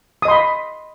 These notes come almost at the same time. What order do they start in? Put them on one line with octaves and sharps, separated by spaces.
D#6 D#5 C6 B5